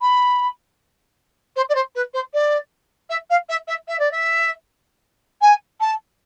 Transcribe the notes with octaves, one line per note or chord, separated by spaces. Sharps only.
B5
C5
D5
C5
B4
C5
D5
E5
F5
E5
E5
E5
D5
E5
G#5
A5